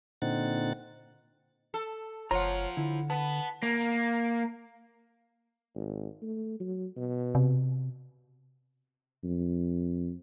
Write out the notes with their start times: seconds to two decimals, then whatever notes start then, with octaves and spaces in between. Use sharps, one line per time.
0.22 A#2 D3 C4 D#4 F#5 A6
1.74 A4
2.31 F#1 F3 F4 C#5 F#5 A#5
2.77 D3 E4
3.10 B3 A5
3.63 A#3
5.75 G#1
6.22 A3
6.60 F#3
6.97 B2
7.35 C3
9.24 F2